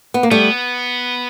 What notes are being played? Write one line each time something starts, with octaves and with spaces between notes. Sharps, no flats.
B3
A#3
G3 A3 B3